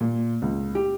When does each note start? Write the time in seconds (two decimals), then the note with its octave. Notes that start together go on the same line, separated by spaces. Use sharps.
0.01 A#2
0.42 C#2
0.75 G4